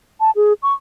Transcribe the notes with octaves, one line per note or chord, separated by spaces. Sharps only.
A5
G#4
C#6